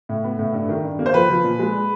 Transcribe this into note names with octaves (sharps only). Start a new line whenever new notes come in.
A2
B3
A2
G2
D#3
G2
A#3
C5
F3 B4
F3
A#2
G#3